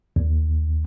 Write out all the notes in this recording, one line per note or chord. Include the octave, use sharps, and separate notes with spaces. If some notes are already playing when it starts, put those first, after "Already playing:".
D#2